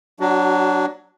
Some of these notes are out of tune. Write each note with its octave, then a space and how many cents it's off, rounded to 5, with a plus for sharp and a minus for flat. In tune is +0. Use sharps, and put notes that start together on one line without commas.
F#3 +0 D4 +0 F#4 +30